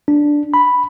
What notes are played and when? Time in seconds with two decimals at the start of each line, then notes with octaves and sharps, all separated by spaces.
0.08 D4
0.54 B5